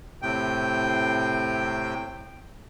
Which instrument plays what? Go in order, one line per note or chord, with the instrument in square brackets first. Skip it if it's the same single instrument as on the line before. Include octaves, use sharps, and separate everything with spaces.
[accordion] A2 C3 G5